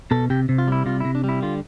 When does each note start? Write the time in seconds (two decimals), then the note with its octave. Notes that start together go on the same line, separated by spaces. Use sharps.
0.11 B2 A4
0.30 C3 G4
0.49 C3
0.58 F4
0.67 G3 E4
0.86 C3 F4
1.00 C3 E4
1.15 D4
1.24 G3
1.29 E4
1.43 D3 F4